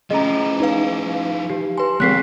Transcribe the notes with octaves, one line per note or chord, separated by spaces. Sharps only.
F3 A3 C#4 E4 G#4 D#5 A#5
D#4 B4 F5
G4
B4 G#5 C6
C2 F2 G#3 C4 G#4 F#6 B6 C7